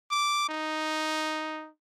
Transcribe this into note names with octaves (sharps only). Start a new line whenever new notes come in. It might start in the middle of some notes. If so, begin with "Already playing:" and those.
D6
D#4